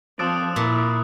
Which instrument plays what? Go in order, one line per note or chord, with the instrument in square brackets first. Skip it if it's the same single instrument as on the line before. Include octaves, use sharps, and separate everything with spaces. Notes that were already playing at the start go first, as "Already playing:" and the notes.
[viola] F3 C4 [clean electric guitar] A4 D5 [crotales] D#6 E6 F#6
[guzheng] A#2 [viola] E4